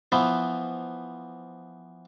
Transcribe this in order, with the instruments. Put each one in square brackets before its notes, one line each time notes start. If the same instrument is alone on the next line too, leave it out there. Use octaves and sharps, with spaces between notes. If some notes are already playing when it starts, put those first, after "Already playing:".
[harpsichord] E3 F3 B3